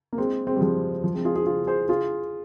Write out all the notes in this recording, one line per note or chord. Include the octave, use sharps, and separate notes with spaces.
A#3
G#3 C4
G#3 C4
G3
F3 G#3
F3
G#3 C4
F4 G#4
F4 G#4
F4 G#4
G#4 C5
F4 G#4